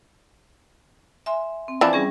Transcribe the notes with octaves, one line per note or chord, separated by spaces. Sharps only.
E5 G#5 C6
C4
E3 F3 D4
G3 C#4 G#4